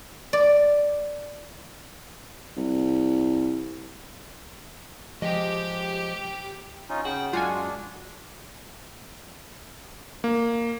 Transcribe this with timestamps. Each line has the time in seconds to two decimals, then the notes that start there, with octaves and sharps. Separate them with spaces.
0.33 D5
2.57 C2
5.22 F3 G#3 G4 D#5
6.90 C#4 D#4 F4
7.05 C#3 F#4 G5
7.33 F#2 G#3 D4 F4 F#4 G#5
10.24 A#3